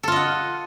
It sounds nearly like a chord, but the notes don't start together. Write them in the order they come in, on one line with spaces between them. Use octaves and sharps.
A4 F4 D#5 F#5